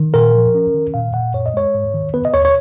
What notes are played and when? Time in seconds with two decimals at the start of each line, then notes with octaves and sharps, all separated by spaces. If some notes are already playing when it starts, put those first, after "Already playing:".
Already playing: D#3
0.14 A#2 A#4
0.35 F3
0.55 C#4
0.74 D#3
0.94 A#2 F5
1.14 A#2 F#5
1.34 F#2 C#5
1.46 D#5
1.54 G#3 C#5
1.74 G#2
1.94 D#3
2.14 B3 B4
2.25 D#5
2.34 D#2 C#5
2.45 C#5